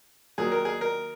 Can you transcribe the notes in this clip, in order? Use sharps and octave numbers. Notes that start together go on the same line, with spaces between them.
D#2 D#3 F#3 G#4
A#4
G#4
A#4